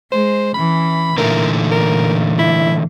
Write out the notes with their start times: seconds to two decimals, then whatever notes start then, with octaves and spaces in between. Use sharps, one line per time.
0.12 G#3 C5
0.55 E3 C#4 B5
1.18 A#2 D3 E3 A3 A#4
1.72 A#4
2.39 E4